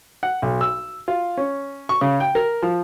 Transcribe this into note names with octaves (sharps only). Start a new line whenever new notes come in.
F#5
B1
E6
F4
C#4
C#6
C#3
G5
A#4
F3